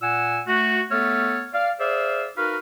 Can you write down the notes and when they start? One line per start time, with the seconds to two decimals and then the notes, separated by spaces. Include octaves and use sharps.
0.01 A#2 F#5 G#5 E6
0.47 A3 F#4
0.91 A3 B3 A4 C#5 F6
1.53 D5 F5
1.79 G#4 C5 D5 E5 F5
2.37 D#4 F#4 A#4 B4 F5